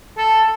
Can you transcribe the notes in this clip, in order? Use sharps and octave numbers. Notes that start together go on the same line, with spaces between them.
A4